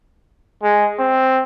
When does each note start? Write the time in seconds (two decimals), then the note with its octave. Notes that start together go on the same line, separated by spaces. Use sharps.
0.63 G#3
0.99 C4